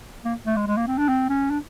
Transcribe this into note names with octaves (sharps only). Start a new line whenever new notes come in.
A#3
A3
G#3
G#3
A#3
C4
D4
C4
C#4
D4